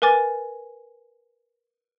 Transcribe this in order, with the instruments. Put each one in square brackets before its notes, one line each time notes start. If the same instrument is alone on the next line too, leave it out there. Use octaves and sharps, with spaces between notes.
[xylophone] A#4 B4 G#5 D6 A6